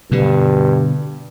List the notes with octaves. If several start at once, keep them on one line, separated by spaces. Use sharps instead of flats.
G2 B2 D3